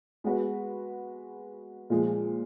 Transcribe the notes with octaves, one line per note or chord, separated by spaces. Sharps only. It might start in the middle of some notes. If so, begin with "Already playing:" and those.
G#3 B3 F#4 B4
A#2 F3 G#3